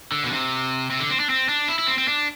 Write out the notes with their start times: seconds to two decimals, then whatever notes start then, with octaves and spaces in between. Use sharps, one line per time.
0.12 D3
0.24 B2
0.32 C3
0.90 C3
1.00 D3
1.10 C4
1.20 D4
1.30 C4
1.49 D4
1.68 E4
1.79 E4
1.88 C4
1.98 C4
2.08 D4